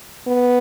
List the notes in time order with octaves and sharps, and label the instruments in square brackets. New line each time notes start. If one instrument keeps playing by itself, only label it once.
[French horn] B3